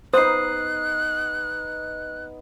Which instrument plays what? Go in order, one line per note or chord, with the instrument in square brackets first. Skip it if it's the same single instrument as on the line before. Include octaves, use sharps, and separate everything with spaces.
[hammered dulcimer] B3 D#4 [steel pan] C5 [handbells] D#6 C7 [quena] F#6